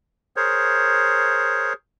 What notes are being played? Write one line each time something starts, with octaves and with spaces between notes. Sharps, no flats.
G#4 A#4 C5 C#5